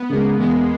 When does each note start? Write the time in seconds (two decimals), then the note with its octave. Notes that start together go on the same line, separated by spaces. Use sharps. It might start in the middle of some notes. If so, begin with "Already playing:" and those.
Already playing: B3
0.09 C#3 G#3 A#3
0.38 E2 G#3